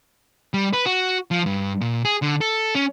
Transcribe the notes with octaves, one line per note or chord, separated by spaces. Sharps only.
G3
B4
F#4
F3
G2
A#2
G#4
D3
A4
C#4